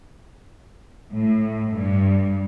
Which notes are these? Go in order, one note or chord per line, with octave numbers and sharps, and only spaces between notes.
A2
G2